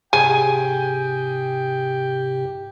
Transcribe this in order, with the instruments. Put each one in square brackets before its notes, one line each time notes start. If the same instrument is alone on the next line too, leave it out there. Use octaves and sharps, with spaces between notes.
[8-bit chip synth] G#2 C3 G4 [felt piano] G#4 [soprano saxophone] G5 [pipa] G#5